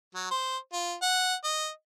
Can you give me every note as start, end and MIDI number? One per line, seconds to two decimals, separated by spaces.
0.15 0.27 54
0.31 0.57 72
0.73 0.94 65
1.02 1.34 78
1.44 1.68 75